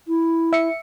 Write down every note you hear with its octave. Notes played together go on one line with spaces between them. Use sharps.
E4
E5 C#7